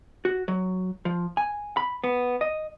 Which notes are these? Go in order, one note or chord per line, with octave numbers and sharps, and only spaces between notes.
F#4
F#3
F3
G#5
B5
B3
D#5